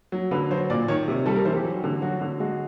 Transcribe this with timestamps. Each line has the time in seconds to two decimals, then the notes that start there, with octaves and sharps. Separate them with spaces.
0.12 F#3
0.31 D3 B4
0.51 F#3 C5
0.70 A#2 D5
0.88 D#3 C#5
1.08 C3
1.26 G3 A4
1.36 A#4
1.45 E3 C5
1.54 G4
1.65 F#3
1.84 D3
2.02 F#3 F#4
2.21 D3
2.40 G#3 F#4